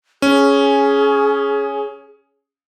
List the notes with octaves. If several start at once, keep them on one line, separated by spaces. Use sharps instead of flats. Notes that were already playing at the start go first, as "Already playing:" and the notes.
C#4 G#4